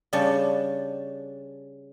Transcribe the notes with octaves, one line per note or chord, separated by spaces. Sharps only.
C#3 G3 C#4 D4 D5 A5